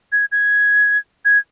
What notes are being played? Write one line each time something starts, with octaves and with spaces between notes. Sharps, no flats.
G#6
G#6
G#6